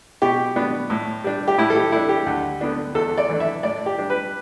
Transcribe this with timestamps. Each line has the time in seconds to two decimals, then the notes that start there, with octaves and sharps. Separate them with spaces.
0.22 B2 G4
0.56 B3 D4
0.90 A2
1.24 G3 D4
1.48 G4
1.58 A2 E4
1.70 A4
1.76 G4
1.92 A3 D4 E4
2.09 G4
2.26 D2
2.61 D3 B3 D4
2.95 E2 A4
3.18 D5
3.29 E3 A3 D4
3.40 E5
3.63 A2 D5
3.86 G4
3.98 G3 D4
4.10 B4